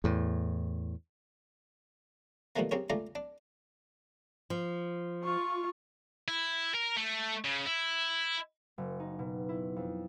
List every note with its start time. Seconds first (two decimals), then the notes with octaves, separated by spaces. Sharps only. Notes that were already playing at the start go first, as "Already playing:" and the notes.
0.04 E2 A2
2.56 B2 D#3 F3 G3 A3 A#3
2.71 C#3 C4 G4 A#4 C#5
2.90 C#2 A3 F4 D5 A#5
3.15 D4
4.50 F3
5.24 F4 C#6
6.28 E4
6.75 A#4
6.97 A3
7.45 C#3
7.66 E4
8.78 F#1
9.00 D#4
9.19 B2
9.49 E4
9.76 F2